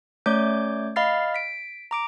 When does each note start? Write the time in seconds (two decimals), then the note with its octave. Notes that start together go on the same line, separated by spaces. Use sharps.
0.26 A3 C#4 C#5 D5 D6 G6
0.96 D#5 F5 B5 F6 A6 C7
1.34 B6 D7
1.91 A#5 D6 D7